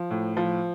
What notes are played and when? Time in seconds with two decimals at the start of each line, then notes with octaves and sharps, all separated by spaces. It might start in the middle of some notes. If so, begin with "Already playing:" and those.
Already playing: F3
0.11 A2
0.37 F3